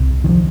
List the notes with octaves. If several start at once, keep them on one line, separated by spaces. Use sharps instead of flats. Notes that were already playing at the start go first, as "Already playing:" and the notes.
Already playing: C2 C3
D#3
F3